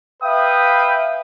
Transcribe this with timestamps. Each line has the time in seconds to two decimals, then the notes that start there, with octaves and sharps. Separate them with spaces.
0.23 B4 E5 F5 G5 D#6